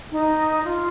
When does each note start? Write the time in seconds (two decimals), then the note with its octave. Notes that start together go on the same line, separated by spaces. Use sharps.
0.12 D#4
0.64 F4